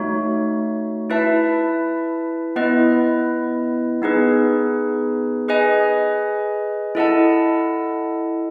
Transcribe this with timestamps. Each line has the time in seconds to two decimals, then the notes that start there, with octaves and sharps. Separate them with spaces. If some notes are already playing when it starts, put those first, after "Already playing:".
Already playing: A3 D#4 F#4 C#5
1.10 E4 B4 E5 A5
2.56 B3 E4 B4 D#5
4.02 B3 D#4 G#4 B4
5.48 G#4 B4 D#5 G#5
6.95 E4 A4 D#5 F#5 A5